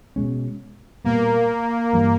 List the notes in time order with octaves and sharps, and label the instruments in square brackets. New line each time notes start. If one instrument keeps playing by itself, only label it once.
[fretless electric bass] B2 G#3 C#4
[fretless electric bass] A#2 G3 B3 [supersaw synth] A#3
[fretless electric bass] G2 E3 G3 A#3